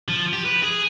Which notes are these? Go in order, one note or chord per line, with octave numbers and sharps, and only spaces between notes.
F3
G4
B4
G#4